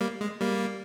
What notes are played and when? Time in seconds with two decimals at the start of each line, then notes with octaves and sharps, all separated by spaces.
0.01 G3 A#3
0.21 G#3
0.41 G3 A#3